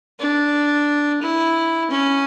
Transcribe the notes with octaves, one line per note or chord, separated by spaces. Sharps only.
D4
E4
C#4